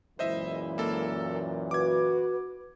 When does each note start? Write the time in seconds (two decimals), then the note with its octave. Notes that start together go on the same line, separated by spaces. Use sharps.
0.19 F#2 A#2 E3 G#3 E4 C5 D#5 E5
0.78 A#3 A4
1.71 F#4 B4 D6 G#6